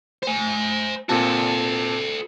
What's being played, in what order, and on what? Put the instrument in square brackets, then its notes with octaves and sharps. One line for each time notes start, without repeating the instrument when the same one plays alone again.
[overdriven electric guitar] C5 G#5
[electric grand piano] A#2 C4 A5 [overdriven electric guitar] F#4 A4